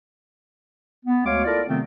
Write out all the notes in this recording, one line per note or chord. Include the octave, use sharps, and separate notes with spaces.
B3
D2 G#3 F#4 C#5 F5 D6
E4 F4 A4 A#4 D5
C3 D#3 F#3 A3 B3 C4